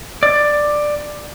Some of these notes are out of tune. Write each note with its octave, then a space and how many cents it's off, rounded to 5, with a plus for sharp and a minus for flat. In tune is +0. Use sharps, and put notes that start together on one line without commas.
D5 +10